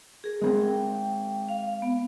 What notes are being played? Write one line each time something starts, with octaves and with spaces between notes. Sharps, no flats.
G#4 A#4
G#3 A#3 C4
G5
F5
B3